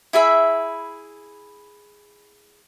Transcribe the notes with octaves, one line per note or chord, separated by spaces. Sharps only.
E4 G#4 E5 B5